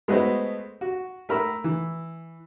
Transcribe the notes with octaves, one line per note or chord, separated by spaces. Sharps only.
G#3 A3 B3 F#4 C5
F#4
A3 A#4 B5 E6
E3